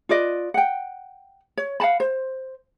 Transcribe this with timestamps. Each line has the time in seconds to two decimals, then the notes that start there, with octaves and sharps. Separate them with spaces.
0.09 F4 B4 D5 D#5
0.54 F#5 G5
1.57 C#5
1.80 F5 F#5 A5 B5
2.00 C5